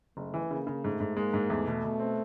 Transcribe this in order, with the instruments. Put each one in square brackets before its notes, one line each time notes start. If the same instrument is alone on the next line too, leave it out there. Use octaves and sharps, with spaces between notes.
[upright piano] F#1 [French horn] A3
[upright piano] E3
[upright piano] C#3 [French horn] A#3
[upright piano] C#3
[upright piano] G#2 [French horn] A3
[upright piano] G#2
[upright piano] G#3 [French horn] A#3
[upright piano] G#2
[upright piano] E2 [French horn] A3
[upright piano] B2
B2
C4